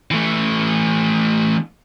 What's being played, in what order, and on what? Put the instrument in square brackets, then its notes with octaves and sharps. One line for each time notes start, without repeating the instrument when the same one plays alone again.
[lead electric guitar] E3 A3